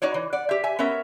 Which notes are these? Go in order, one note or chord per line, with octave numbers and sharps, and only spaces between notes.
D#4 F#4 C#5 D5
E3
D5 F#5
G4 E5
E5 G#5
B3 C#4 A#4 E5